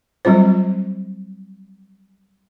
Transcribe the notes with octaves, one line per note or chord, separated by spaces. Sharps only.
F#3 G3 C4 F4 C5